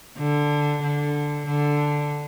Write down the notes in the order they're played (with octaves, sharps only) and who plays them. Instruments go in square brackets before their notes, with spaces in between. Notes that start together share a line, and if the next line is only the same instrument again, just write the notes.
[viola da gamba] D3
D3
D3